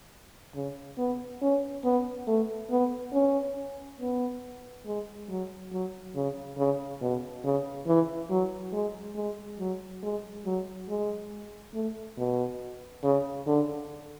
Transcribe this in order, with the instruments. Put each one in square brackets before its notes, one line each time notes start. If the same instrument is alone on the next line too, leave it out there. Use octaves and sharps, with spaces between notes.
[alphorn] C#3
B3
C#4
B3
A3
B3
C#4
B3
G#3
F#3
F#3
C#3
C#3
B2
C#3
E3
F#3
G#3
G#3
F#3
G#3
F#3
G#3
A3
B2
C#3
D3